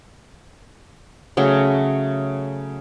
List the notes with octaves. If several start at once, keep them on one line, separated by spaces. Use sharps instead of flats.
C#3 F#3 A3 F#4